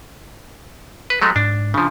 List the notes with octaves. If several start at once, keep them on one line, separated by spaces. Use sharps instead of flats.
B4
F#3 G#3 A3
G#2 D4
C#3 F3 D4